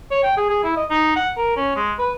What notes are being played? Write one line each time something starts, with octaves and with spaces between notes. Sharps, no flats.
C#5
G5
G#4
G#4
E4
D#5
D#4
F#5
A#4
C#4
G#3
B4